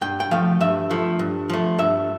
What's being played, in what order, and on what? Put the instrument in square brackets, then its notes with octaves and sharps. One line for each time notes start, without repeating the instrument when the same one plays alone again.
[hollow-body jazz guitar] G2 G5
G5
F3 A3 F5
G2 E5
F3 A3
G2
F3 A3
G2 E5